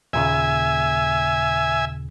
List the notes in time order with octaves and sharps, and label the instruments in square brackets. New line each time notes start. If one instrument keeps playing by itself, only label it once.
[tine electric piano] D#2 A#2 C#3 [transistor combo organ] E5 G#5